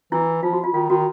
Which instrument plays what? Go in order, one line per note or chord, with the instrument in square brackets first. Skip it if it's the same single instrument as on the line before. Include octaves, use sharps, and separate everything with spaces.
[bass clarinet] E3 [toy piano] E4
[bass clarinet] F3 [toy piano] F4
[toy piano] F#4
F4
[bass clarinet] D#3 [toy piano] F4
[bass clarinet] D#3 [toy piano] F#4